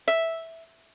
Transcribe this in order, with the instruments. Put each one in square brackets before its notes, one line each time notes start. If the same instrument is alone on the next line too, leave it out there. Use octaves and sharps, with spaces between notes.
[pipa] E5